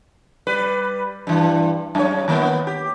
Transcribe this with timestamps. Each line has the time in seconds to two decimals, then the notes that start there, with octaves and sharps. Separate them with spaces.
0.47 G3 B4
1.27 G2 E3
1.95 F#2 C#5
2.28 D#3 A#3 B3
2.67 G4